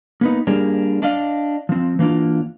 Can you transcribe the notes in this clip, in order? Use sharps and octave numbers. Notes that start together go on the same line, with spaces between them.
A#3 B3 D#4
G3 A#3 D4 G#4
D4 D5 D#5 F5
F3 C4
E3 A#3 D4 F4